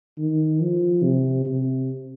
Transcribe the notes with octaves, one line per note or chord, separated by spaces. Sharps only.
D#3
F3
C3
C3